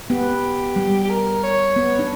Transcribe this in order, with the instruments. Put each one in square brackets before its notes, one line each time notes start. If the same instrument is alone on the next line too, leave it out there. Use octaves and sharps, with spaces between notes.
[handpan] B3 [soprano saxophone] G4
[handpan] G3
[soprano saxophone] G4
A#4
C#5
[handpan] B3
D4